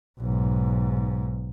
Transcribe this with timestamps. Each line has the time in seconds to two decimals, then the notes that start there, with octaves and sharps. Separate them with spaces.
0.19 B1 G#2